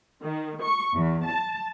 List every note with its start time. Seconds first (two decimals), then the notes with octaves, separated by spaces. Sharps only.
0.22 D#3
0.61 C#6
0.95 E2
1.26 A5